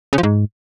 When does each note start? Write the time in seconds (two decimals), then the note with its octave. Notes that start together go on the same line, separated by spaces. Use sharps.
0.13 C#3
0.18 F3
0.23 G#2